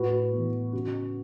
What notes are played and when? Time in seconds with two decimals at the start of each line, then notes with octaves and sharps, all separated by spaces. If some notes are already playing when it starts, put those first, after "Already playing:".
Already playing: A2 F#4 B4
0.32 E3 B3
0.73 C#3 F#4